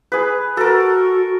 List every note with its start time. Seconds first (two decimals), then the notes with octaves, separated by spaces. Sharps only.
0.12 G#4 B4
0.57 F#4 A4 A#4